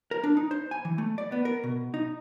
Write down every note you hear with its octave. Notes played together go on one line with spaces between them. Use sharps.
A#4
D4
D#4
C5
G#5
E3
A3
D5
B3
A#4
B2
D#4